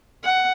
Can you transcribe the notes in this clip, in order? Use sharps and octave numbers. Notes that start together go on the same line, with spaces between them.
F#5